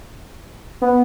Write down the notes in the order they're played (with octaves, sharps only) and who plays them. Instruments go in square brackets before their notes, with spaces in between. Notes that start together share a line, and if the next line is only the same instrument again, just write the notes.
[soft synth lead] B3